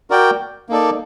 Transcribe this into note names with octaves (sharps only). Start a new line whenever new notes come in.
F#4 A#4 D5 G5
A#3 D#4 A4 D5